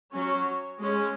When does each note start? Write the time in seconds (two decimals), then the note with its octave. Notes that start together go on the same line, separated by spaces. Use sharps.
0.14 F#3 C#4 C#5
0.78 G#3 C#4